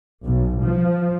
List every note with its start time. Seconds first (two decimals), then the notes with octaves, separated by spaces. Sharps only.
0.24 B1
0.61 F3